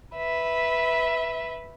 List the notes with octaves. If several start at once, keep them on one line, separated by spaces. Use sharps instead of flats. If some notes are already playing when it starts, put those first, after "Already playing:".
B4 E5